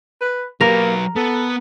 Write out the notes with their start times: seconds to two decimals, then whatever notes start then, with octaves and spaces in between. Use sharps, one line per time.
0.21 B4
0.61 F#3 A#3 A#4 B4
1.16 B3 A4